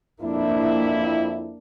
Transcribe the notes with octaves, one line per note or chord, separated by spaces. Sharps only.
F2 A#3 D4 E4